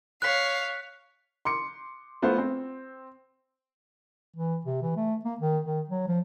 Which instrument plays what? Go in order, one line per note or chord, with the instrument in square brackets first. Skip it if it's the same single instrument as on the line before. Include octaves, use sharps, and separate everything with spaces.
[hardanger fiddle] C#5 [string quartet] F5 [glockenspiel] F#6 B6
[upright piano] C6 D6 C#7
A3 B3 F4 C5 C6
C4
[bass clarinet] E3
C3
E3
A3
A#3
D#3
D#3
F#3
F3